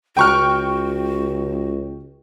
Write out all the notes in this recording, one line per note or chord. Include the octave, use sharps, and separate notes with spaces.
C#2 F#4 G5 C#6 F6